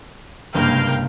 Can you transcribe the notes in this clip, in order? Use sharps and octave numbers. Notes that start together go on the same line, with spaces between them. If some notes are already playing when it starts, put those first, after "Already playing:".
F#1 G2 C3 G#3 A#3 D4 F5 G5